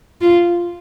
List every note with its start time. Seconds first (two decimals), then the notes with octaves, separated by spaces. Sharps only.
0.21 F4